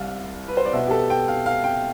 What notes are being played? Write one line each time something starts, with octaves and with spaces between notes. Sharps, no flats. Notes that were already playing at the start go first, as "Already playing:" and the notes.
Already playing: C2 C3 G3 F5
B4
C5
D5
B2 B3 E5
G4
A4
G5
F5
F5
G5